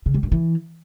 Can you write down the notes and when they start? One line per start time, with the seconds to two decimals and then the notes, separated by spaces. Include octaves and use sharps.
0.06 C#3
0.14 G3
0.23 G2
0.32 E3